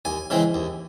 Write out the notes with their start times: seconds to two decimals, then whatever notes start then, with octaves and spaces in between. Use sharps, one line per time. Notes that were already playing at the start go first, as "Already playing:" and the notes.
0.05 D#2 G#5
0.30 C#3 E3 G#3 C4
0.54 D#2